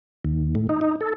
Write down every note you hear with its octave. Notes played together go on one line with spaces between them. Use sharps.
D#2
A2
D#4
D#4
A4